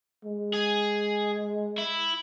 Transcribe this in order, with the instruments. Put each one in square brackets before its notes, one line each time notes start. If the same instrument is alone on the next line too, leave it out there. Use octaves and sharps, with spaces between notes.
[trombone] G#3
[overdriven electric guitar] G#4
E4